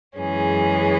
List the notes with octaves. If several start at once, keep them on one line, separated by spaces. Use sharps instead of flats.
F#2 E3 G#3 C#4 G#4